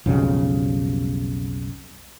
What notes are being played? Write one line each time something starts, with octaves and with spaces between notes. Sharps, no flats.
B1 F2 C#3 G3